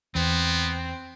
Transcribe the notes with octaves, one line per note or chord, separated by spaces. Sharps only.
E2 B3 C4